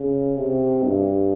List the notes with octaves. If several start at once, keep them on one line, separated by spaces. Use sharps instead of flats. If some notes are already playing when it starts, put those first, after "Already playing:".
Already playing: C#3
C3
G2